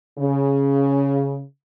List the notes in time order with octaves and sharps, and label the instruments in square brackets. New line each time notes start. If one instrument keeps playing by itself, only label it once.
[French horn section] C#3